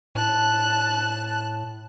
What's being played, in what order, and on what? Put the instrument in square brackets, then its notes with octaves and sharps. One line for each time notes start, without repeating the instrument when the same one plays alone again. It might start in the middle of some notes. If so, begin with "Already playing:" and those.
[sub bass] A2 [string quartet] A5 F#6